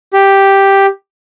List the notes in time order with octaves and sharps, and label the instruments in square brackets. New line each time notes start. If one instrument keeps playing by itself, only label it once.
[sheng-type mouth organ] G4